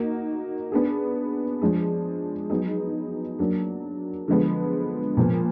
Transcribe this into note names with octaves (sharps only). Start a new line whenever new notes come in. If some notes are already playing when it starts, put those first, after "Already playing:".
Already playing: A#3 D#4 F#4
B3 D4 G#4
F3 G#3 D4 G#4
F#3 B3 D#4 G#4
F#3 A#3 D4
D3 F3 G#3 B3
A#2 F3 B3